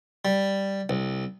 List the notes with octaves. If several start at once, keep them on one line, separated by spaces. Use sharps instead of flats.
G3
C2